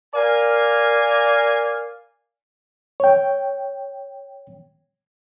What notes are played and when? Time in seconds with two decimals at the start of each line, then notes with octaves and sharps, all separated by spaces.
0.13 A#4 D5 F5 G#5
3.00 C#5 G5